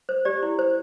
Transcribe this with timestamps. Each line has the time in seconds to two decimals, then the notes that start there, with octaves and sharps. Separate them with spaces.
0.09 C5
0.25 G4 D5
0.43 E4
0.59 C5